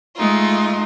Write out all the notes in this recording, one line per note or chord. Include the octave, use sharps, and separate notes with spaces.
G#3 A3 D#4 F4